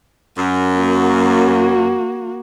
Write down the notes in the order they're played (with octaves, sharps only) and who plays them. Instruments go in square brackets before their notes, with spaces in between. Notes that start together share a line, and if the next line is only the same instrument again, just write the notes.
[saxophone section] F#2
[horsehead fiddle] A#3 F#4